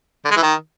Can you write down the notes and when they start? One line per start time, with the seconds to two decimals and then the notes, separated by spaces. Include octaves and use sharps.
0.25 D3
0.31 G#3
0.37 E3
0.43 D#3